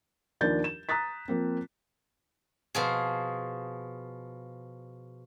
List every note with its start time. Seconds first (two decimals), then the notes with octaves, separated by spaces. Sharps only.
0.41 D#2 F3 D4 A#4 G6 A6
0.64 E7
0.89 A#5 D#6 F#6 A6 B6
1.28 F3 A#3 C4
2.75 B2 F3 G#4